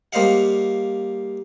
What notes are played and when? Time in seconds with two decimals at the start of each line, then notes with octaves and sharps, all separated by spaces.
0.13 G3 A#3 C5 D#5 F5 F#5